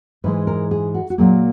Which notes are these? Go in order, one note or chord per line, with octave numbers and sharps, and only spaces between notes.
G#2 E3 G#3 B4
A#4
G#4
F#4
F#4
A#2 F#3 A#3 G#4